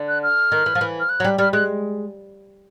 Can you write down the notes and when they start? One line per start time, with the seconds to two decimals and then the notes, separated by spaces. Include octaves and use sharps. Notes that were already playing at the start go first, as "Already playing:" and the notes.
Already playing: D3
0.08 F#6
0.23 F6
0.52 D#3
0.66 E3
0.75 F3
0.81 E3
1.00 F6
1.09 F#6
1.20 F#3
1.25 G3
1.39 G3 F6
1.53 G#3 F#6